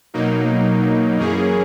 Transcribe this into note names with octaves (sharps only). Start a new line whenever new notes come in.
B2 F#3 A#3 D#4
F#2 E3 A#3 C#4 G#4